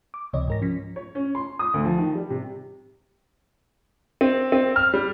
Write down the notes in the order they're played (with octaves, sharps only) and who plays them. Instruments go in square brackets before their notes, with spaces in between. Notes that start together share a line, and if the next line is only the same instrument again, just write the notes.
[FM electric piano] D6
C#2 C3 E3 C#5 D#5
G#2 A#4 A#6
F3 C#4 B6
[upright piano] C#5
C#4
C6
D#6
D2
F3
D#3
G3
C3
C4
C4
F6
G3